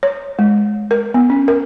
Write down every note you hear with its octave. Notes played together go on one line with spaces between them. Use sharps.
C#5
G#3
A#4
B3
C#4
A#4